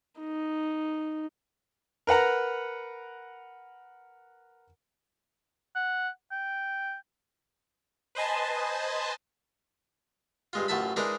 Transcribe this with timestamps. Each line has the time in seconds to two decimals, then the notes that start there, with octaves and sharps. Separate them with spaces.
0.20 D#4
2.07 A#4 B4 F#5 A#5
5.75 F#5
6.31 G5
8.15 B4 C5 D#5 G#5 A5
10.53 G2 G#3 F4
10.68 A1 F#2 F4 E5 A5 B5
10.96 E3 G#3 D4 D#4 A#4